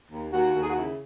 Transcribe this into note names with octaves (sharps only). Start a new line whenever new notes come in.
D#2
D#2 F#4
D#2
G#4
F#4
C#3 E4